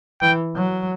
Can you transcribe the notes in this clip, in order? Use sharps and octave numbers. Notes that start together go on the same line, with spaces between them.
E3 G5
F#3